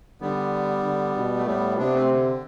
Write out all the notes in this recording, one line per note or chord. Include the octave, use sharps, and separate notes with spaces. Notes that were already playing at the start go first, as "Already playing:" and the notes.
D3 G3 B3
D3
B2
A3
A2 G3 B3
C3 B3 D4
A3 C4
D3